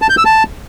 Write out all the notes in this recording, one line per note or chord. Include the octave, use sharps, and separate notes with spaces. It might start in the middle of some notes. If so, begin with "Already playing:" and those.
A5
G6
E6
A5